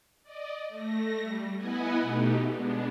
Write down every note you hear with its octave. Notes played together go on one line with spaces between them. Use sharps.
D5 D#5
A3 A#6
G3
B3 E4 B4 D#5 F#5 G#5
B2 A3 D#4 G4
G#3 B3 D4